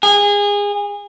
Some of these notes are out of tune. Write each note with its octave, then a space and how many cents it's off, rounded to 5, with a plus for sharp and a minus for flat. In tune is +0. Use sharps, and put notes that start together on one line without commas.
G#4 -25